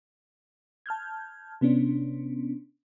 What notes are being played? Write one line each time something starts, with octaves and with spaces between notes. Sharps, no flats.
A5 F6 G6 G#6
C3 B3 C#4 D4